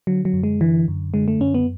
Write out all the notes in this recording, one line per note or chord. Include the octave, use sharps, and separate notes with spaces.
D3 F#3
F#3
F#2
G#3
D3 E3
F#2
D3 G#3
A3
F#2 C#4
B3